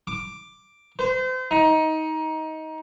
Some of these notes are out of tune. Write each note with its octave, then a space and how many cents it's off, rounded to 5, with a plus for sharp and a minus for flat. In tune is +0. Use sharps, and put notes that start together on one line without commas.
D6 +5
C5 -35
D#4 +20